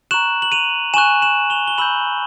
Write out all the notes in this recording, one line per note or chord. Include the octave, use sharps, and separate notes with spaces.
A#5 C#6 F#6 E7 F#7
F#7
D#7 F7
G#5 C#6 F#6 E7 F#7
E7 F#7
F7 G7
G7
B5 E6 G6 E7 F#7